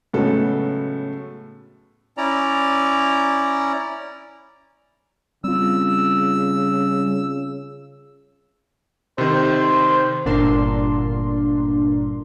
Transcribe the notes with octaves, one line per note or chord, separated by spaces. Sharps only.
A2 C#3 F#3 G#3 B3 A4
C#4 E4 D5 A#5
C#3 G3 C4 F4 E6
C3 D#3 C5
G1 A#2 D3 D4 A#4 C6